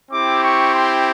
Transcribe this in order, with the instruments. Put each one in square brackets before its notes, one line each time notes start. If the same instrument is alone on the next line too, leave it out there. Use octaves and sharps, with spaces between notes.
[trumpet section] C4 E4 G4 D6
C#6
C6